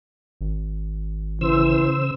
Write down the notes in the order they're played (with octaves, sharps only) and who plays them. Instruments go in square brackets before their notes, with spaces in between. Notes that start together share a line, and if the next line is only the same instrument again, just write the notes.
[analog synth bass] G#1
[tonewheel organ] C#3 C5 E6 [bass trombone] E3